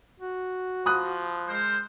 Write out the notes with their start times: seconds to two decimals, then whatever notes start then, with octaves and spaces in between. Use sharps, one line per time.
0.20 F#4
0.86 F3 B5 D#6 F#6
1.48 G#3 A#4 C5